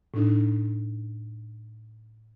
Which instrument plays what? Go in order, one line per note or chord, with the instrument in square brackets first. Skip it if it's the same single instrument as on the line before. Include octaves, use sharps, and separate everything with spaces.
[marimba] A2 D4 D#4